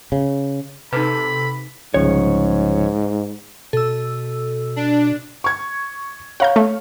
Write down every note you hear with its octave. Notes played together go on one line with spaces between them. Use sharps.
C#3
C3 D#4 A4 B4 B5
C2 G#2 C#3 F3 C#5
B2 A4 E6
D4
C#6 G#6
C#5 F5 F#5 A#5 G6
A3